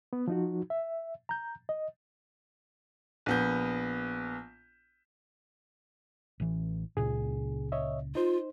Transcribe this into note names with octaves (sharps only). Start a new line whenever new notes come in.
B3
F3 D#4 F#4
E5
A#5 G6
D#5
A#1 B3 G6
A1 E3
C#2 A#2 C#3 G#4
C#5 D#5 E5
D#4 F4 C5